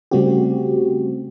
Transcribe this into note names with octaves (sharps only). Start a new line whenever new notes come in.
C#3 G3 A3 C4 F#4 G4